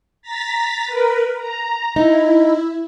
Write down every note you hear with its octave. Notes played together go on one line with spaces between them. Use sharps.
A#5 A6 B6
A#4 B4
A#5
D#4 E4